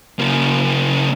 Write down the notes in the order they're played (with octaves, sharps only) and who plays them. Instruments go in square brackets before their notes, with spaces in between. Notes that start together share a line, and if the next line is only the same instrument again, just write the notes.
[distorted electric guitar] C#3 A#3